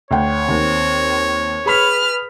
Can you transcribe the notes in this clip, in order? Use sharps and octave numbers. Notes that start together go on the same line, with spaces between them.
D2 C#5 G5
D#2 C4
G#4 B4 B5 F6 B6